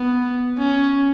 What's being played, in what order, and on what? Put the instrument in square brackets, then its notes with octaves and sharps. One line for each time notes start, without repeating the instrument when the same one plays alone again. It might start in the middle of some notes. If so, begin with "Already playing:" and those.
Already playing: [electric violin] B3
C#4